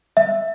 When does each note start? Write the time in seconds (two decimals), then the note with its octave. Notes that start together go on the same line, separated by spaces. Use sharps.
0.17 E5